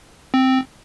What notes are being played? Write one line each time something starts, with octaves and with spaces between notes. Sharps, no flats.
C4